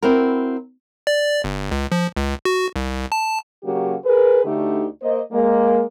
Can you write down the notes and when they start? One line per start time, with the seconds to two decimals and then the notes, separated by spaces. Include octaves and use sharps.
0.03 C4 E4 F#4 A#4
1.07 D5
1.44 G1
1.71 C#2
1.92 F3
2.17 C#2
2.45 F#4
2.76 C2
3.12 A5
3.64 C#3 F#3 A#3 F#4 G4
4.05 G#4 A#4 B4
4.44 D2 D3 A3 D#4 G4
5.02 A#3 C5 D#5
5.32 G#3 A#3